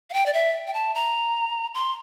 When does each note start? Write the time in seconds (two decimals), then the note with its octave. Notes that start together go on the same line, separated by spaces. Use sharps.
0.10 F5
0.13 G5
0.26 D5
0.33 E5
0.67 G5
0.74 A5
0.95 A#5
1.75 C6